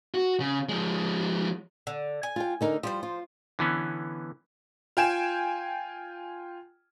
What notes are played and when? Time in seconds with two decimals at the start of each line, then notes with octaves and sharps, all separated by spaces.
0.14 F#4
0.40 C#3
0.69 F3 G#3
1.87 D3
2.23 G#5
2.36 F4 G5
2.61 D3 D#4 A#4
2.83 F3 G3 F4 C5
3.03 F4
3.59 D3 E3 B3 C#4
4.97 F4 G5 G#5 E7